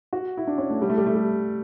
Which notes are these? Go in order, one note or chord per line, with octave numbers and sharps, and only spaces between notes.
F#4
E4
D4
C#4
A3
G3
A3
G3
A3
G3